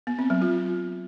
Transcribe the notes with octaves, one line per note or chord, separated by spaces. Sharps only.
B3
C4
F#3
F4